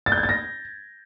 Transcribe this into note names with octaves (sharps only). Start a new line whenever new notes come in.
A6
G6
G#6
A6
A#6